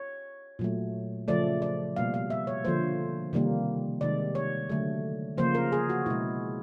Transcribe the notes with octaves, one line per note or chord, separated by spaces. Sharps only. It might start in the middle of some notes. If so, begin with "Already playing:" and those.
Already playing: C#5
A#2 F#3 A3
C#3 F3 A3 D5
D5
B2 G3 A#3 F5
F5
E5
C#5
D3 F3 A#3 C5
C3 D#3 G3 A#3
C3 D#3 G#3 D5
C#5
D3 F#3 A3
C#3 F3 A#3 C5
A#4
G#4
F#4
B2 G#3 E4